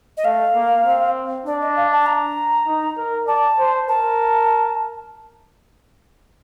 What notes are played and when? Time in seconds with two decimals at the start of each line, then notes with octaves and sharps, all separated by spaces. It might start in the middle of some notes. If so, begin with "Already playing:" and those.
0.17 D#5
0.24 A3 F5
0.54 A#3
0.85 C4
1.46 D4 D5
1.61 D#5
1.76 F5
1.92 A5
2.06 A#5
2.67 D#4
2.97 A#4
3.27 D5 A5
3.58 C5
3.88 A#4 A5